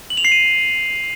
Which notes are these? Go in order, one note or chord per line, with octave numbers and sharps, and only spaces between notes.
F#7
F7
C7
D#7